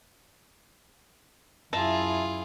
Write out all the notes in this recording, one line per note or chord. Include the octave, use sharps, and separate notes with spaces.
F#2 E4 F4 G#4 E5 A5 A#5